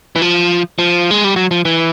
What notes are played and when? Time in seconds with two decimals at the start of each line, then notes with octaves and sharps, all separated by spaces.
0.16 E3
0.22 F3
0.79 F3
1.11 G#3
1.24 G3
1.36 F#3
1.51 F3
1.65 E3